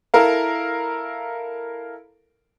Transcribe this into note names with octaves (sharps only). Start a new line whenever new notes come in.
E4 A4 A#4 F5